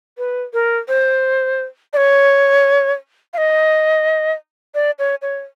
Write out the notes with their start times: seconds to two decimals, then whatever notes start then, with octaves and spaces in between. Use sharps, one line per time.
0.18 B4
0.53 A#4
0.88 C5
1.93 D5
1.97 C#5
3.33 F5
3.38 D#5
4.74 D5
4.99 C#5
5.22 C#5